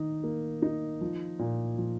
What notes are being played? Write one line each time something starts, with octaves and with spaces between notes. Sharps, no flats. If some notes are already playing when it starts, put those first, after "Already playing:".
Already playing: D#3 D#4
A#3
D#4
F3
A#2
F3